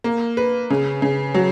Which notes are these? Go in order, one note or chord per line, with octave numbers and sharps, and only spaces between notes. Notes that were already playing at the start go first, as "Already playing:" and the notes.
A#3
B4
C#3
C#3
F#3